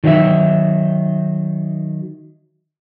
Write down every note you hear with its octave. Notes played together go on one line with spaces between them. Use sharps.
D#3 F#3 D#4 G4 E5